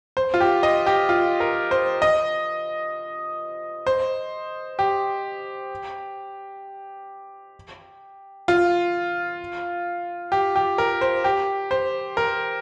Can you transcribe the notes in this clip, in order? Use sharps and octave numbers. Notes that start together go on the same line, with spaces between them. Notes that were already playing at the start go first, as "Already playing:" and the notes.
C5
F4
G4
D#5
G4
F4
A#4
C5
D#5
C5
G4
F4
G4
G4
A#4
C5
G4
C5
A#4